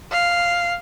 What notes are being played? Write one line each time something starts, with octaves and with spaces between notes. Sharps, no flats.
F5